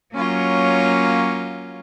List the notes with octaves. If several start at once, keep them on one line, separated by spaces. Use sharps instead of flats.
F#3 A#3 C#4 F4 C#5